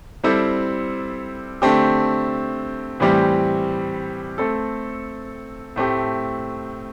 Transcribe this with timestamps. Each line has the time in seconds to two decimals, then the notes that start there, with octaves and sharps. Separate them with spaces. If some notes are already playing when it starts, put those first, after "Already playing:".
0.24 G3 C4 E4 A4 C5
1.62 D3 A3 C4 G4
3.00 A2 E3 G3 C4 G4
4.38 A3 C4 A4
5.76 A2 A3 C4 G4